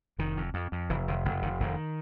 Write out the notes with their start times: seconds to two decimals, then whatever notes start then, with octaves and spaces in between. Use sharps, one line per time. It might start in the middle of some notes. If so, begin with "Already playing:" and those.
0.18 F1 D#3
0.37 F2
0.54 F2
0.72 F2
0.90 F1 E3
1.08 F1 D#3
1.25 F1
1.42 F1 D#3
1.60 F1 D#3